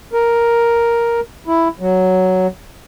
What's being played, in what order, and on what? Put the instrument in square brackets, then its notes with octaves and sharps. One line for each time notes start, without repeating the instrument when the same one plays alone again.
[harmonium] A#4
E4
F#3